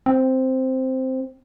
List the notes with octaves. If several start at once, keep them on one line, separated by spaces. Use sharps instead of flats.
C4